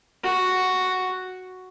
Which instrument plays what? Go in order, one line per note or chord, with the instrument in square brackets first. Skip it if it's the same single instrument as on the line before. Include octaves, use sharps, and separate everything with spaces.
[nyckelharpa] F#4